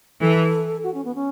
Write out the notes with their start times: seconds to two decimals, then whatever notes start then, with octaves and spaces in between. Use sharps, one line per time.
0.21 E3 A4
0.83 F#4
0.94 C#4
1.05 B3
1.15 C#4